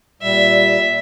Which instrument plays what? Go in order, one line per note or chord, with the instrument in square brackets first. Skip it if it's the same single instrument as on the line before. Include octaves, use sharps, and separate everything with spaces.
[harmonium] A#2 G3 [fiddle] E5